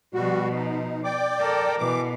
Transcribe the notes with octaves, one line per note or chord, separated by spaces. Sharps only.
B2 F3 G3 F#4
D#4
D5 G5 D6
A4 A#4
B2 E3 D6